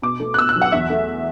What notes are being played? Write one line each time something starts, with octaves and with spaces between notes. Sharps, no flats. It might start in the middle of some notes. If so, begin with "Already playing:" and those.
B2 D6
A3
F#6
B2 E6
F#6
F#3
F#5
E2 E5
A3